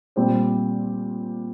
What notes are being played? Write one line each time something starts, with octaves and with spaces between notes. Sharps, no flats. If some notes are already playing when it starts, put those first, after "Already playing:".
A#2 G3 C4 G4 C5